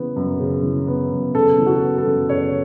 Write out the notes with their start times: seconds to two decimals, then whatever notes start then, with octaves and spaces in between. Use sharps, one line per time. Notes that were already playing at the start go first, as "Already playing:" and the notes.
Already playing: C#3 E3 B3
0.16 F#2
0.39 C#3
0.63 E3
0.87 B3
1.11 F#2
1.35 C#3 A4
1.58 E3
1.66 F#4
1.82 B3
1.98 A4
2.06 F#2
2.29 C#3 C#5